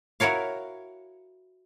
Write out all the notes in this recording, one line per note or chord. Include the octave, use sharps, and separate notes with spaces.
E4 F#4 A#4 C#5 F5